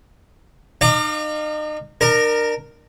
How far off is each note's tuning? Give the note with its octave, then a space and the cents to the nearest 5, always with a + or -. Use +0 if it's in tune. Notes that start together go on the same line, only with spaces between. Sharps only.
D#4 -35 F5 +0 D6 +30
D4 +40 A#4 +0